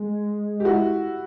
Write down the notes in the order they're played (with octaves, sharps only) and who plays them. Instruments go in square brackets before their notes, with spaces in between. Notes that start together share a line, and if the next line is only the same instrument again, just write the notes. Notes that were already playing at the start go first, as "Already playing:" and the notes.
Already playing: [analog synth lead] G#3
[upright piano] G4
E4 F#4